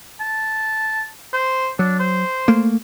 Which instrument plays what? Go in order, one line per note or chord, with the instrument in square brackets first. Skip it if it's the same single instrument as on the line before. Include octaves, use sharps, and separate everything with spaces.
[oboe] A5
C5
[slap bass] F#3 [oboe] D4
[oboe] C5
[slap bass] A3 A#3